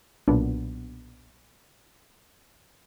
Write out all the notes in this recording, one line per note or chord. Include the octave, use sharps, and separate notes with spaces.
B1 A#2 B3 D4